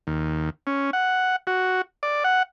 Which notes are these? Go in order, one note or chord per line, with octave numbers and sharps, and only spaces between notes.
D#2
C#4
F#5
F#4
D5
F#5